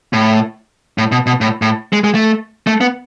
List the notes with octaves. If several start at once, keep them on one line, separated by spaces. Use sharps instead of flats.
A2
A2
B2
B2
A2
A2
G#3
G#3
A3
A3
B3